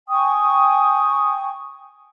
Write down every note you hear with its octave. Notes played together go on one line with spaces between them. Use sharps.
G5 G#5 C#6 D#6